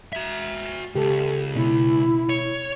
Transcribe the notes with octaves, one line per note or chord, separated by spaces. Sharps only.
F#4 E5
C#2 G4 A4
B2 E4
C#5